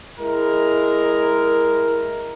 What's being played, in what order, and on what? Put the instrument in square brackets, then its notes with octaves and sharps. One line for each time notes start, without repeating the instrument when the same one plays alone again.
[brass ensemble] G#3 E4 A#4